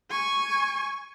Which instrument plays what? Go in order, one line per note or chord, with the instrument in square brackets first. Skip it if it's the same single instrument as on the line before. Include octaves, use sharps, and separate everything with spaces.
[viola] G#5 C#6